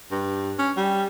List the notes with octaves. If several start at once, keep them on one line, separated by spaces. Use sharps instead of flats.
G2
C#4
G3